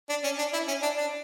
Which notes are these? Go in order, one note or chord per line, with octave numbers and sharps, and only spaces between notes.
D4
C#4
D4
E4
C#4
D4
D4